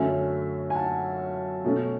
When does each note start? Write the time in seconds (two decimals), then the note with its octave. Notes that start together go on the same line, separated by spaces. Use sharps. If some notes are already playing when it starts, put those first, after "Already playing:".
Already playing: F#2 D3 F#3 A3 C#4 E5 G#5
0.70 G#5
0.75 F#5 A5
1.64 B2 A3 C#4